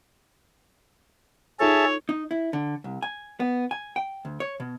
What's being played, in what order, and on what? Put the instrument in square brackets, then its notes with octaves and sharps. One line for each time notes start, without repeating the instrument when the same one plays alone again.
[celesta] D#4 F4 A4 [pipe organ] G#4 E5 A5 [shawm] C#5
[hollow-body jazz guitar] D#4
E4
D3
C2
G#5
B3
G#5
G5
D2
C#5
B2